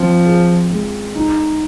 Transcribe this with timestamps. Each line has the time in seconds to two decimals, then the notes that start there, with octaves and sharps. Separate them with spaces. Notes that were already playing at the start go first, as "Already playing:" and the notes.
Already playing: F3 C4 F4
0.25 G#4
0.70 G#3
1.15 D#4